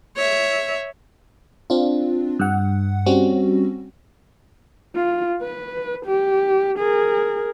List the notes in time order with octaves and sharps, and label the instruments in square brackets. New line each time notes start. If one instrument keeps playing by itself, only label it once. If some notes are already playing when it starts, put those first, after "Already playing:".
[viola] C#5 E5
[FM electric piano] C4 D4 F4
G2 F#5
G3 C4 C#4 F#4
[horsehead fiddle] F4
B4
G4
G#4 A#4